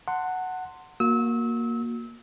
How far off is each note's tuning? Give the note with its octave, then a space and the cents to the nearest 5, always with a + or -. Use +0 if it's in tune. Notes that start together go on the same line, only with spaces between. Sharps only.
F#5 +0 A5 +40 C6 +0
A#3 +5 F#4 -30 E6 -30